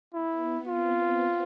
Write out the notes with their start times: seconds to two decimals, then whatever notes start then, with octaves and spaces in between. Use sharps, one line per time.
0.14 B3 E4
0.66 C4 F4